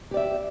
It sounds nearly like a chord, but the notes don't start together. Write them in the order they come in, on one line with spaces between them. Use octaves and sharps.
G4 D5 E5